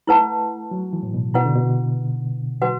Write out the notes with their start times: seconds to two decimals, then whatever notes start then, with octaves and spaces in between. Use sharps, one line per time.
0.07 A3 E4 B4 F#5 A5
0.71 F#3
0.93 E3
1.03 A2
1.14 B2
1.34 B2 E4 B4 F#5
1.45 D3
1.55 B2
2.62 F#4 B4 F#5